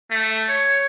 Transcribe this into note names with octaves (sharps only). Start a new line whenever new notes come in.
A3
C#5